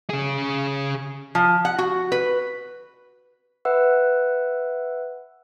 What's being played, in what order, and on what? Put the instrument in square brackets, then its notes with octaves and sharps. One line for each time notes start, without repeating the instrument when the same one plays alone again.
[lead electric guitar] C#3 G#4
[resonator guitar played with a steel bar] F3
F#5
F#4
B4
[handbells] B4 E5 F#5 E6